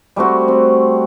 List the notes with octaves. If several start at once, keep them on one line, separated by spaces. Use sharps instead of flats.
G3 A3 C4 F#4
C4